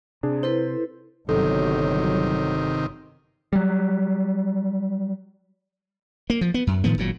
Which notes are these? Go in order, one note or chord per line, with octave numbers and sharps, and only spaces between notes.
C3 D4 G#4
E4 A4 B4 C5
G1 C3 D#3 F#3 A4
F#3 G3
A#3
F3
B3
F#2
A2 D#3 F3 B3
G#1 A#2 F#3